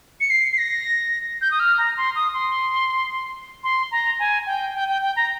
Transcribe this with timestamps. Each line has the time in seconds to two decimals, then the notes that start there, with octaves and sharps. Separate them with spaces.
0.21 C#7
0.30 C7
0.52 C7
0.58 A#6
1.41 G6
1.51 D#6
1.60 F6
1.78 A#5
1.97 C6
2.15 D#6
2.34 C6
3.64 C6
3.91 A#5
4.19 G#5
4.46 G5
4.75 G5
4.89 G5
5.02 G5
5.16 A#5